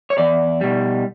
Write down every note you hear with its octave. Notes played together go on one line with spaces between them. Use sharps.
C#5
E2 D5
B2 G3